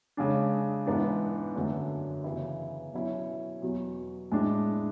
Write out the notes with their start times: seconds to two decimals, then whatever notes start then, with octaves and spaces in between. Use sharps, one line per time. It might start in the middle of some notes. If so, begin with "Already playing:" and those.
0.17 C#3 G#3 D4
0.86 G#2 E3 B3 D4
1.56 F#2 D3 A3
2.24 C#3 E3 B3 E4
2.93 B2 F#3 C#4 E4
3.62 E2 B2 F#3
4.32 A2 G#3 D4